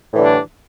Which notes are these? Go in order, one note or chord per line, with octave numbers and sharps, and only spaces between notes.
A2 D3 E3 G3 D4